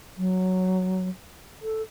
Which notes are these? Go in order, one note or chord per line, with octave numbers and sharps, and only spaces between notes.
F#3
A4